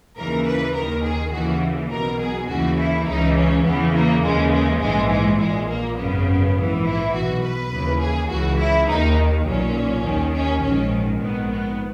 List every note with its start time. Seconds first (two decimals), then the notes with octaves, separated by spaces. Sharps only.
0.17 D#2 C#3 E3 A#4
0.46 B4
0.75 D#2 D#3 A#4
1.03 G#4
1.32 D#2 C#3 E3 F#4
1.91 B1 B2 A#4
2.20 G#4
2.49 D#2 C#3 E3 F#4
2.78 E4
3.07 C#2 C#3 E3 D#4
3.37 C#4
3.65 E2 C#3 E3 B3
3.94 A#3
4.23 D#2 C#3 E3 G#3
4.53 G#3
4.81 A#1 G#2 E3 G#3
5.11 G#3
5.39 A#1 A#2 G#3
5.69 A#3
5.97 G#1 F#2 C#3 B3
6.55 A#1 G#2 E3
6.85 E4
7.14 B1 B2 F#4
7.43 B4
7.72 D#2 C#3 E3
8.01 G#4
8.29 C#2 C#3 E3 F#4
8.58 E4
8.88 D#2 D#3 D#4
9.46 B1 A#2 C#4
10.04 D#2 D#3
10.34 C#4
10.62 A#1 G#2 D#3 C#4
11.20 A#1 G#2 D#3 B3
11.50 B3